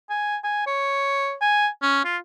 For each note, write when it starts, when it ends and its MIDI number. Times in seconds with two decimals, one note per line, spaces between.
0.10 0.37 80
0.44 0.64 80
0.67 1.33 73
1.41 1.67 80
1.82 2.02 61
2.04 2.17 65